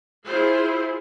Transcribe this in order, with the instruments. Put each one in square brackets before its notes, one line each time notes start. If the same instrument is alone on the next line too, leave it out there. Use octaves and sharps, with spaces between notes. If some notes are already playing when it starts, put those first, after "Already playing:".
[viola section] E4 F4 G#4 C5